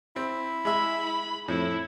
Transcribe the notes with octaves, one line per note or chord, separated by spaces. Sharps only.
C4 E4
G#3 E5 B5
F2 A2 E4